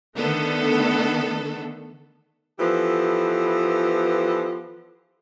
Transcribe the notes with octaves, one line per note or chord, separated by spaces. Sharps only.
D3 D#3 A3 B3 A4
E3 F3 B3 G4 A4